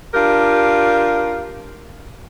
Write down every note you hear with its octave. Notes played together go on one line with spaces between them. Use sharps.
D4 F4 G4 A#4